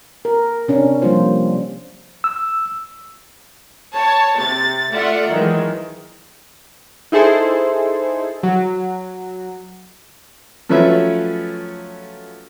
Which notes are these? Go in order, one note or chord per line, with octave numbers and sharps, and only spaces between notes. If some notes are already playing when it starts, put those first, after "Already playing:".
A#4
C3 C#4 D4
F3 G3 A#3 F4 C5
E6
C#5 A5
C3 A6
A3 F4 D5 E5 F#5
D#3 E3 F#3 G#3
D#4 E4 G#4 A4 C5
F#3
F3 F#3 A3 C#4 B4 E5